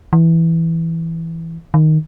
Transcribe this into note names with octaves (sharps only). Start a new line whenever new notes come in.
E3
D#3